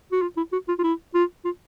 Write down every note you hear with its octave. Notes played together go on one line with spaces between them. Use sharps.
F#4
F4
E4
F#4
F4
F4
E4
F4
F4